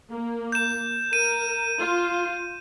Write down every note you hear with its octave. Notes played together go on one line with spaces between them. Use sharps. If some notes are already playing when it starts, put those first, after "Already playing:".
A#3
G6 E7
A#4 D#7
F4